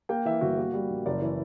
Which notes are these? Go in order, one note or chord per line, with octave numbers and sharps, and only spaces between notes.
A#3 G5
E3 E5
G1 F#4
A#3
G3
A#1
F#1 D5
E3